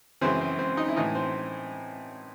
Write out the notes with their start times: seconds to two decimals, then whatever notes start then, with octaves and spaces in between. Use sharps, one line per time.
0.21 F#2 C#3 E3 C4
0.41 C4
0.59 C4
0.77 D#4
0.89 E4
0.96 A2 E3 D#4
1.15 C4